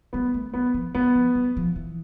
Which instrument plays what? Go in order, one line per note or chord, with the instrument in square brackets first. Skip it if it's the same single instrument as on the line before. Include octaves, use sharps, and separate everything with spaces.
[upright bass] G3 [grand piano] B3
[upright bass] A3
[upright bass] G3 [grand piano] B3
[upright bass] F3
[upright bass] G3 [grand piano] B3
[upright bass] F3
G3
F3
E3